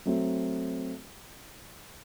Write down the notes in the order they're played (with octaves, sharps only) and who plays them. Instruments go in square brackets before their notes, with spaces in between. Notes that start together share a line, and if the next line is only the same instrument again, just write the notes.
[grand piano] F#3 A3 C4